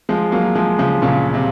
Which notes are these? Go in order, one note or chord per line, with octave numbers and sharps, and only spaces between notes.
F3 G#3
F#3 A#3
F3 G#3
C#3 F3
A#2 C#3
C3